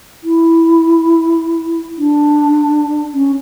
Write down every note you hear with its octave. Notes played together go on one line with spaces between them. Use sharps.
E4
D4
C#4